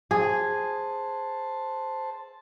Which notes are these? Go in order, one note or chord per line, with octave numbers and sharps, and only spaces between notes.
G#4 C5 A5